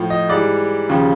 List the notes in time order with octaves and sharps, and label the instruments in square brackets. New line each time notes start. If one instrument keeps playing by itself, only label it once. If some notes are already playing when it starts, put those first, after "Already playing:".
Already playing: [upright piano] A2 F3
D#5
G#2 E3 G3 D5
D#2 C#3 F3